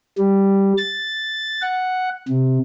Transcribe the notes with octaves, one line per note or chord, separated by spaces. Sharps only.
G3
A6
F#5
C3